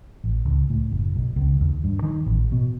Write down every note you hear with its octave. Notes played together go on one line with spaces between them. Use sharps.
A1
C#2
A2
F#1
B1
C#2
D#2
G2
D#3
A1
B2